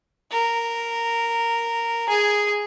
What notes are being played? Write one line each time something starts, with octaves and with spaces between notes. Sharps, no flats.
A#4
G#4 G#5